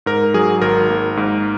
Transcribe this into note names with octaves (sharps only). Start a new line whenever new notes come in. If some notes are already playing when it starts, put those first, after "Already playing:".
G#2 A#4
F#3 G#4
G#1 A#4
A#3
G#2